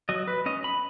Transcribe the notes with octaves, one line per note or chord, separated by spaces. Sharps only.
F#3 D#5
B4
C#4 D#5
B5